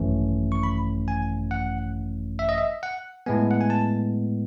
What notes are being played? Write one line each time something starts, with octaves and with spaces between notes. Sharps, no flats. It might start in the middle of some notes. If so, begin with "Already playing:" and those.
Already playing: G#1 F#2 E3 A3 C#4
C#6
B5
G#5
F#5
E5
D#5
E5
F#5
A2 G#3 B3 G#5
F#5
G#5
A5